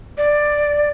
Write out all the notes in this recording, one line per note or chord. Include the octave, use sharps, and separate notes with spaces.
D5